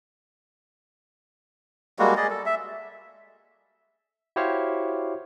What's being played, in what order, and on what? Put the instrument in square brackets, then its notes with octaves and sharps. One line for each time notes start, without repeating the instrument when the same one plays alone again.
[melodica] G3 G#3 A#3 F#4
G#4 D5 D#5
A4
E5
[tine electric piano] E4 F#4 G4 C5 C#5 F5